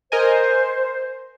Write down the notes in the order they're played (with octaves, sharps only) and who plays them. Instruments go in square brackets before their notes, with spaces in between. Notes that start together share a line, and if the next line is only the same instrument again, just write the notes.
[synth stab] A#4 D#5 G#5 [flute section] C5